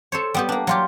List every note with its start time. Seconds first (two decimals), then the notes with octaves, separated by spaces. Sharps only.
0.12 A4 C5 C#5
0.34 G3 B3 G4
0.49 A#3 D4
0.67 F#3 F4 G4